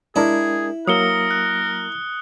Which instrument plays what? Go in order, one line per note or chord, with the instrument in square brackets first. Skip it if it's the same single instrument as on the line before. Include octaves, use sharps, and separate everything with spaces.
[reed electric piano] G#3 D4 A#4 [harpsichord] E4 [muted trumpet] G#4
[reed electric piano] F#3 A#3 E6 [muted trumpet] A#4 [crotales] D#6 C#7 G7
[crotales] F#6